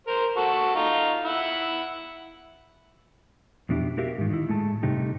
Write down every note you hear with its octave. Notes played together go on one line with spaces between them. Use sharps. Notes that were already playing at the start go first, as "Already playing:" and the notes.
A#4 C5
F#4 A4 C#6
D#4 F4
E4 F#5
F2 B2 D4 E4 G4
E4 F#4 G4 A#4 E5 F5
G#2 D#3
D#3 E4
A2 G#3 A3 A5
G2 C3 A3 D#4 G4